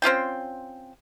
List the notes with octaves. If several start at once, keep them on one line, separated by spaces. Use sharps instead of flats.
C4 C#4 F4 G5